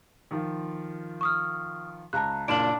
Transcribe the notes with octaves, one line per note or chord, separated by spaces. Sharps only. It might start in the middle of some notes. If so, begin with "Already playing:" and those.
D#3 F3 F4
C#6 D#6 F6
C#2 A5 A#5 F#6
F#1 A#2 D4 D7 E7 F#7